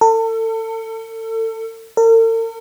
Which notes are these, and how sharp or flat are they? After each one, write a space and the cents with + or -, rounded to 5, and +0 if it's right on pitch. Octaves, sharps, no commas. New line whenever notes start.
A4 +35
A#4 -45